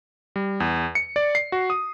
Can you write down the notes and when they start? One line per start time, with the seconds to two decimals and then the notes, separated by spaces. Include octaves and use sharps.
0.36 G3
0.60 E2
0.95 C#7
1.16 D5
1.35 C7
1.52 F#4
1.70 D#6